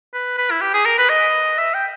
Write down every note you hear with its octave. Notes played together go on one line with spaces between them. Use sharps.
B4
B4
E4
G4
G#4
A#4
B4
D#5
E5
G5